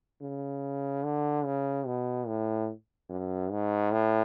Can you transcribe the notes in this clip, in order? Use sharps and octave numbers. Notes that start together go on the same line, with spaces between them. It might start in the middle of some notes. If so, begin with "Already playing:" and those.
C#3
D3
C#3
B2
A2
F#2
G#2
A2